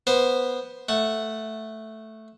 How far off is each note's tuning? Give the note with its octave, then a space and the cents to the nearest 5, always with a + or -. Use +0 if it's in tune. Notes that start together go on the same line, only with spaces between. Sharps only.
B3 -5 C5 +0
A3 +0 F#5 +0